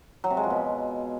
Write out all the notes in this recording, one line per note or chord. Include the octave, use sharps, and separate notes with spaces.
F#3
C3
G#3
F3
B2